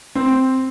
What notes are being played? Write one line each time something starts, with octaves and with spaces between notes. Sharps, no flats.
C4